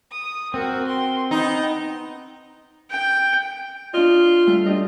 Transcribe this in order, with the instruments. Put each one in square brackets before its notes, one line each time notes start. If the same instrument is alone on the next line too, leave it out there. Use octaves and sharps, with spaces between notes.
[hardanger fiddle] D#6
[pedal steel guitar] C4 [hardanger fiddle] F#4 [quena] A#4
[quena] G5 [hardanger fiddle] C6
[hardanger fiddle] B3 [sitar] D#4
[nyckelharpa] G5
[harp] D4 D#5 [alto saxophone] F4
[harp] G3 A3
D4 G4 D#5